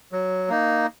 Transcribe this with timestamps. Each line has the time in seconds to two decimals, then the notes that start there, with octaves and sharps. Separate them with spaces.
0.12 F#3
0.49 A#3 D#4